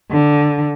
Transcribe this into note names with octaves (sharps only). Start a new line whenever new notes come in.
D3